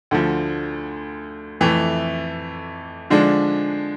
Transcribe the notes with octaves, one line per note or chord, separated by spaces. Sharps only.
D2 D3 F3
F2 E3 A3
D3 F3 G#3 D4